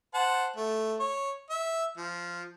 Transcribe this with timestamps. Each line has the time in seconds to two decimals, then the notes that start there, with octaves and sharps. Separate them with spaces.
0.14 C5 F#5 A5
0.56 A3
1.00 C#5
1.50 E5
1.97 F3